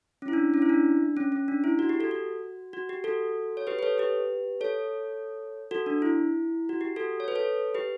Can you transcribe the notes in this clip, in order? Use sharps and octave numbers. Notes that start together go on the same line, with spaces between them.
C#4
E4
D4
C#4
E4
D4
C#4
C#4
D4
E4
F#4
G4
F#4 A4
F#4
F#4
G4
F#4 A4
C#5
G4 B4
B4
A4 C#5
G4 B4
A4 C#5
F#4 A4
D4
E4
F#4
G4
F#4 A4
C#5
B4
A4 C#5
G4 B4